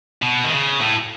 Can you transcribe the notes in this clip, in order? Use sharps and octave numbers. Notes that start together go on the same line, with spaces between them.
B2
D#3
C#3
A2